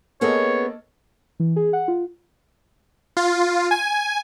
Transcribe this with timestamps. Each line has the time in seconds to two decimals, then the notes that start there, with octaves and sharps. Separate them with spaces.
0.21 A#3 B3 C#4 G#4 A4 C#5 D#5
1.40 E3
1.56 G#4
1.73 F#5
1.88 F4
3.17 F4
3.71 G#5